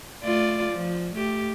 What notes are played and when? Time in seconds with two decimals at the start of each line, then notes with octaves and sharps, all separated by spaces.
0.23 A3 F4 D5
0.71 F3
1.14 A3 G4